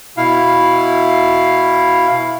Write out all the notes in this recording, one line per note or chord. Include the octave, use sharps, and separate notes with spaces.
B2 E4 F5